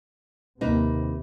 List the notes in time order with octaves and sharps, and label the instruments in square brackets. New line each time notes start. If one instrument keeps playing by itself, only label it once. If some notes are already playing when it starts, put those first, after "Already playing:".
[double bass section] D#2 C3 [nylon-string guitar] A#3 D#4 B4